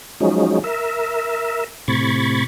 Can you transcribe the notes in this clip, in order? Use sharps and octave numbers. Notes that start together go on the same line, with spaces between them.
F3 F#3 G#3 C#4 D#4
A#4 E5
A2 C3 B5 C#6 G#6 A6